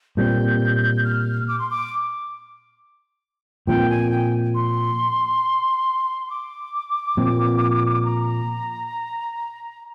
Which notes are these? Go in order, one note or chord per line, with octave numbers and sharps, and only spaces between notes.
A#2 G3 C4 G6
F6
D6
C6
D6
A#2 F3 C4 G5
G#5
G5
C6
D6
A#2 F3 C4
A#5